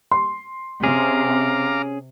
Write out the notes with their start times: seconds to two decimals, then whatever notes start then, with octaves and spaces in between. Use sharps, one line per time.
0.11 C6
0.84 C3 C#4 G#4 F5 A#5 D6